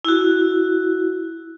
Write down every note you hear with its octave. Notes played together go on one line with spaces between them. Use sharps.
E4 F#4